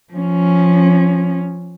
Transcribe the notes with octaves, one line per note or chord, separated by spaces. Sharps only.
F3 C#4